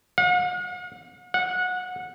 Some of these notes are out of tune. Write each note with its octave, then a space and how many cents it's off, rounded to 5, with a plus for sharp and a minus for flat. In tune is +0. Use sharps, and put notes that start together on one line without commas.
F#5 -45
F#5 -20